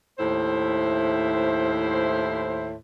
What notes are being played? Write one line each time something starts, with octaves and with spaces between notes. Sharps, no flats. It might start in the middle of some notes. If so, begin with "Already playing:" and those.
D#2 A2 E4 C5